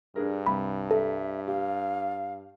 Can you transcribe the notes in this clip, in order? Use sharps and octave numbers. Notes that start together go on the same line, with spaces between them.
G2 D4 G#4 A#4
C2 B5
A4 E5
G4 F5